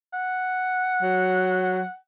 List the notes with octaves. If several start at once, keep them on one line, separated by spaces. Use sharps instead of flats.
F#5
F#3